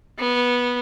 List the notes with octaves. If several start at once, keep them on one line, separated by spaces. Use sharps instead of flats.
B3